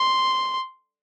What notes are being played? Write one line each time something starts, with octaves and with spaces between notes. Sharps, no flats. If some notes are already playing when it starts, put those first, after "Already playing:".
Already playing: C6